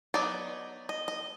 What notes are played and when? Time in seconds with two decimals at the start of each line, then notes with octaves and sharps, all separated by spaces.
0.14 F#3 B3 D#4 D5
0.89 D#5
1.08 D#5